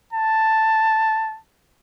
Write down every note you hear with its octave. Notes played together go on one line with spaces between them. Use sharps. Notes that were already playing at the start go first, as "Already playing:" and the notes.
A5